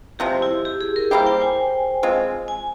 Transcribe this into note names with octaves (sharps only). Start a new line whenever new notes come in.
C3 F3 G#3 G4
E4
G4
G#4
A#4
G3 A#3 E4 G4 C5
G5
G#5
G#3 C4 F4
G#5